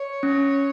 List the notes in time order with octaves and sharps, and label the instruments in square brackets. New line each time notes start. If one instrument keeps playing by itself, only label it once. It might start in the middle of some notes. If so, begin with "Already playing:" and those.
Already playing: [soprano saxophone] C#5
[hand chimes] C#4